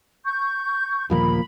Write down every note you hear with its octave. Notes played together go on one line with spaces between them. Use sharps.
C#6 G6
G1 D#2 A#2 F3 A#3 B5